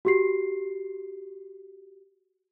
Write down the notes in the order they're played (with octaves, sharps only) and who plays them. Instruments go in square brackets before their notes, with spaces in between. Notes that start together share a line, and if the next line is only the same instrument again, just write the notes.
[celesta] F#4 G4 C7